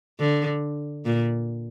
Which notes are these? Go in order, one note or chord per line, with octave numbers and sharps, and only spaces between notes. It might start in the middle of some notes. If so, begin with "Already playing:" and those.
D3
A#2